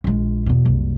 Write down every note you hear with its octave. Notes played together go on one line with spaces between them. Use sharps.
A#1 G#3
E2 B2
F#1 C2